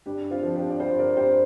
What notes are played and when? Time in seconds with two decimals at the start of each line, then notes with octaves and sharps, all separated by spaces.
0.06 G2 D4 G4
0.30 C4 F4
0.43 F3
0.55 D4 G4
0.69 D5
0.80 G2 G4 C5
0.99 A#4 D5
1.17 G2 G4 C5